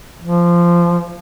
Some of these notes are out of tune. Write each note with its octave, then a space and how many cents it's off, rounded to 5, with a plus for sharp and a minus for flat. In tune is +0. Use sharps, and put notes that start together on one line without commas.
F3 -15